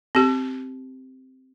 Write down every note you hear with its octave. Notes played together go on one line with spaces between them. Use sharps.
C4 G4